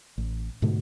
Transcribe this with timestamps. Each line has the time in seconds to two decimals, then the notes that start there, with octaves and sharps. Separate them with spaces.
0.18 A1
0.62 G#2 B2 D3 A3